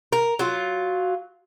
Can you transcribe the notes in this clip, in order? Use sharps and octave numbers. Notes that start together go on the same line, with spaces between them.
A#4
F#3 F4